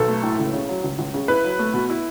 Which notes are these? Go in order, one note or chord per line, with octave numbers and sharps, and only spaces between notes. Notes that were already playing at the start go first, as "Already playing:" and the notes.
Already playing: B1 A4
A3
A2
C#2
C#3
F#3
C#2
C#2
C#3
E4 B4
F#3
A3
B2
E4